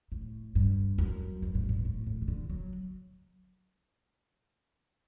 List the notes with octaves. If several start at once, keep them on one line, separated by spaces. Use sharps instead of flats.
A2
G2
F#2
G2
A2
G2
A2
A2
D#3
D3
F#3